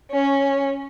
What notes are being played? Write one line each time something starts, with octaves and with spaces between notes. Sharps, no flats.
C#4 C#5